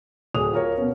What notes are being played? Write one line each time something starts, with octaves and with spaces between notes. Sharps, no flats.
D1 G#4 D#6 F7
F4 A#4 C#5
B2 C#4